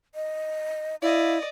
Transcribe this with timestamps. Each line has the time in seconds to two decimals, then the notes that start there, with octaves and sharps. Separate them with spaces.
0.15 D#5
1.02 E4 D5 D#5 F5